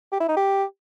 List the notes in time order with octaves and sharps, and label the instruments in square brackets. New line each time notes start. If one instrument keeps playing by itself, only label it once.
[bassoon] G4
E4
D#4
G4